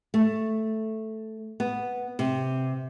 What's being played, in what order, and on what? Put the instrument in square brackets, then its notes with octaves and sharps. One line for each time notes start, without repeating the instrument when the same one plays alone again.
[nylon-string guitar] A3
B3
C3